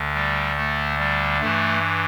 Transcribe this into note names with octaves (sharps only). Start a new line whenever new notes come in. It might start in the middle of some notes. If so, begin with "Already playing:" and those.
Already playing: D2 D3
G3
A3
G3
G2 E3 A3